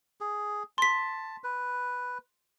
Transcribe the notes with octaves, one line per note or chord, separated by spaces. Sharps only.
G#4
A5 C6 B6
B4